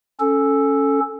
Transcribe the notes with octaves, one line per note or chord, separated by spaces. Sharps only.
C#4 A4